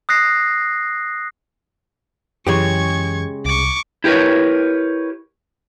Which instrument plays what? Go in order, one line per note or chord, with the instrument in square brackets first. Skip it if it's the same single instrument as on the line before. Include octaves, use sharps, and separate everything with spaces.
[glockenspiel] D#6 F#6 A#6 C7
[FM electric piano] F#2 E3 [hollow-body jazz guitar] C#3 G#3 G4 [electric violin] C#6 G#6
[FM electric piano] C2 [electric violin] C#6 D6
[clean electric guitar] E4 G4 A#4 B4 C#5